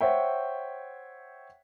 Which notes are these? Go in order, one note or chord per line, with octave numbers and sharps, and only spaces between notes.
C5 C#5 E5 F#5 G5